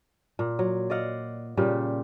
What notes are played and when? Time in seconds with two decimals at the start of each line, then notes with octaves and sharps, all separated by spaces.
0.39 A#2
0.59 F#3
0.90 D5 D#5 F5 F#5
1.57 A#2 C#3 G3 G4